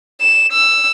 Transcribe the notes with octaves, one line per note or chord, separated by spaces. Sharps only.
E7
E6